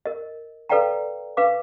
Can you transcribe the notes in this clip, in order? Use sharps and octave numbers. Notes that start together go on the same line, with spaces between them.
A#4 D#5
A4 B4 D5 F5 G5 A#5
B4 F5 D6